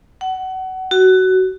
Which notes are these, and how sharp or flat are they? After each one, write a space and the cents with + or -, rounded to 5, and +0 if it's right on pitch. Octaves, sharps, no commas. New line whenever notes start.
F#5 +25
F#4 +15